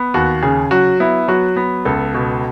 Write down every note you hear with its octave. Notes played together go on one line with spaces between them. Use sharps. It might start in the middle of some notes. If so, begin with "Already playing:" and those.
Already playing: B3
D#2 F#4
C#3 G#4
F#3 F#4
B3 E4
F#3 F#4
B3
C#2 A4
B2